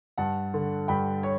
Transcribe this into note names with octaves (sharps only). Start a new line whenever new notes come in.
G2 F#5 A5
D3
G2 G5 B5
C#5